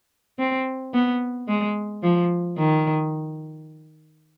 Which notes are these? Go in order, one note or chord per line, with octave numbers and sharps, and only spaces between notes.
C4
B3
G#3
F3
D#3